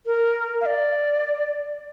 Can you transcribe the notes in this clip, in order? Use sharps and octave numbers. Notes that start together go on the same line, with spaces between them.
A#4
F5
D5